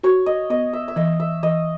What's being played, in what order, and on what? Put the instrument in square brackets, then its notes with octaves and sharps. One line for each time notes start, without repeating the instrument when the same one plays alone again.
[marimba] F#4 [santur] C#5
[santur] D#5
[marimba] B3 [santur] D#5
[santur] E5
E5
[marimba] E3 [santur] D#5
[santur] E5
[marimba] E3 [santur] D#5